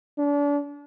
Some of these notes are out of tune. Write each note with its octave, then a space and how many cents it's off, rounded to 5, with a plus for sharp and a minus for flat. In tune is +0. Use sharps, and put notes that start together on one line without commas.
D4 -35